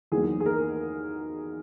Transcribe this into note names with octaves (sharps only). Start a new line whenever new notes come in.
E2 D#3 F#3 A#3 G#4
G#4
A#4